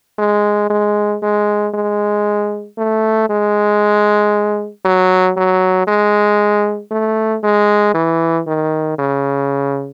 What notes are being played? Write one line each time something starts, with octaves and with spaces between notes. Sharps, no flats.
G#3
G#3
G#3
G#3
A3
G#3
F#3
F#3
G#3
A3
G#3
E3
D#3
C#3